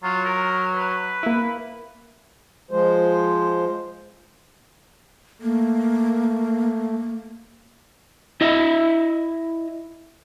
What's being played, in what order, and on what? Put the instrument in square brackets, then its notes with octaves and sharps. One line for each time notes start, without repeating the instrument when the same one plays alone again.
[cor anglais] F#3 [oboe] F4
[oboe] A#4
B4
[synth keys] A#3 E4
[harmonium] F3 G#3 C5
[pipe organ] A3 [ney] A#3
[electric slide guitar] E4 D#5 E5